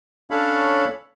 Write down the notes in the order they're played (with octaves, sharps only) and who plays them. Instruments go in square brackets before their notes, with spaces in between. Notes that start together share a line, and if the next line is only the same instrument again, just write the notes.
[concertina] C#4 D4 A4 C#5 F5 B5